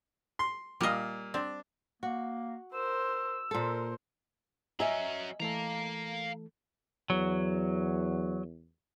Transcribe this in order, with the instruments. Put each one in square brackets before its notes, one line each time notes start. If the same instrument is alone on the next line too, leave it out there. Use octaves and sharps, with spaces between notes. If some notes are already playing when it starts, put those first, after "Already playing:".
[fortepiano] C6
[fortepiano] A#2 F5 [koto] G3 D#5
[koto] C4 [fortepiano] D4
[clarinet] A#3 [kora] F#4
[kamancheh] A#4 C5 [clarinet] E6
[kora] A#2 A4 [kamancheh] A#4 C5
[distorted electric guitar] F#3 C#4 [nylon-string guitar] D#5 E5 G#5 [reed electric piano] A#5
[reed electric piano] E3 A3 A4 [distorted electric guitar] F5 A#5
[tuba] E2 [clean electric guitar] F#3